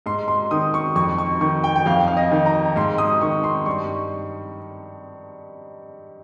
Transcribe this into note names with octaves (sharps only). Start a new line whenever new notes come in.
G#2 C6
C6
D#3 D#6
C#6
F2 C#6
C#6
D#3 C#6
G5
G5
F2 F5
F5
D#5
D#3
A#5
G#2 C6
D#6
D#3 C#6
C6
G2 C#6